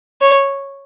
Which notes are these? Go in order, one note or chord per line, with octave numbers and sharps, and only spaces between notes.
C#5